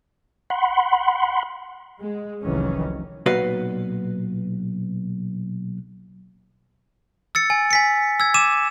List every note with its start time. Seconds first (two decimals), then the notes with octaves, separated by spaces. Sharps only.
0.50 F#5 B5 C6
2.00 G#3
2.42 F1 C2 D#3 E3 F#3 C#4
3.26 B1 A#2 F#4 B4 F5
7.35 E6 A6 C#7
7.50 G#5
7.71 G#5 B6 C#7
8.20 E6 G#6
8.34 D6 D#7 E7